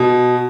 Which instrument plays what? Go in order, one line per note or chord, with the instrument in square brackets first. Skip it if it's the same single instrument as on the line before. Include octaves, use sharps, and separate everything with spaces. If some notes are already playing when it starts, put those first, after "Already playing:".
Already playing: [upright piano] B2